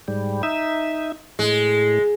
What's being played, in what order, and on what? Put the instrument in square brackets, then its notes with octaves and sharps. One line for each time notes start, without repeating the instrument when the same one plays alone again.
[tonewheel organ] G#2 G3
D#4 E5
[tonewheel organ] A2 [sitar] G#3